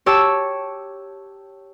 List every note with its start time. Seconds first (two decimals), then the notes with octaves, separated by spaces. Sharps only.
0.06 G4 C#5 A5 E6